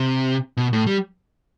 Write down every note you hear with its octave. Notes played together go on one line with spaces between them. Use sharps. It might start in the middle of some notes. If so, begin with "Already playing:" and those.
Already playing: C3
B2
A2
G3